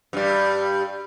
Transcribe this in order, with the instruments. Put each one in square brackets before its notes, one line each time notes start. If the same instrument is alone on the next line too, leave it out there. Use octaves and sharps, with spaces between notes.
[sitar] G2 G3